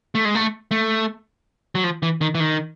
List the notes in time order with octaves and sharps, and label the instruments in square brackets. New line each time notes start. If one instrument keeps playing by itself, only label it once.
[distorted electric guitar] A3
G#3
A3
A3
F#3
F3
E3
D#3
E3
D#3